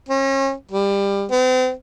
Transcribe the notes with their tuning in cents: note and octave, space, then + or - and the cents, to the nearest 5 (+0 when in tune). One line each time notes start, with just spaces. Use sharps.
C#4 -35
G3 +20
C4 -40